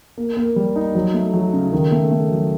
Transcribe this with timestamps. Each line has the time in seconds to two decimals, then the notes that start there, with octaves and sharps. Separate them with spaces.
0.18 A#3
0.37 A#3
0.56 G3
0.76 D#4
0.95 F#3
1.14 A3
1.34 F#3
1.53 C#3
1.72 D#3
1.92 A3
2.11 A3
2.31 F#3